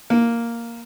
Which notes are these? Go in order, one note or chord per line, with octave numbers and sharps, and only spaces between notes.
A#3